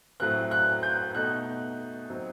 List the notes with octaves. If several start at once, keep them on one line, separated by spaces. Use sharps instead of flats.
A2 F#3 C4 F#6
F#6
G6
B2 A3 D#4 F#6
F#3 C4 D#4